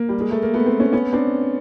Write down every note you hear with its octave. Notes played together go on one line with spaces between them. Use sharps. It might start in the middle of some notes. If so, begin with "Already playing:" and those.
Already playing: A#3
G3
G#3
A3
A#3
A3 B3
A#3 C4
B3 C#4
B3 C#4
C4 D4